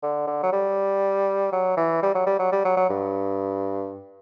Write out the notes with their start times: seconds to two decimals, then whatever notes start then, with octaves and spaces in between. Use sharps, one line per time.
0.03 D3
0.27 D3
0.43 F#3
0.52 G3
1.53 F#3
1.77 E3
2.03 G3
2.15 F#3
2.27 G3
2.39 F#3
2.52 G3
2.65 F#3
2.77 F#3
2.89 G2